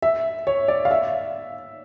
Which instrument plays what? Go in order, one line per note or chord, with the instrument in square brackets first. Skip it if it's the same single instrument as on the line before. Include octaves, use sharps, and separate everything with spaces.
[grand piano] E5
C#5
D5
F5
E5